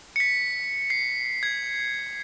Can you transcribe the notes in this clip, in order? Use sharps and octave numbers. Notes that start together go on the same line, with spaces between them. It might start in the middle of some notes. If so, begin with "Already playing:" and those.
B6 C#7
C7
G#6